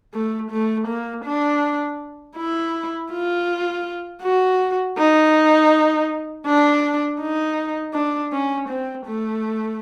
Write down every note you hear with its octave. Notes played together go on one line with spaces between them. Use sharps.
A3
A3
A#3
D4
E4
F4
F#4
D#4
D4
D#4
D4
C#4
C4
A3